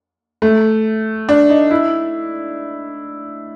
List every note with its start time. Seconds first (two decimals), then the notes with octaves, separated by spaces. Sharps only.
0.42 A3
1.29 D4
1.50 D#4
1.71 E4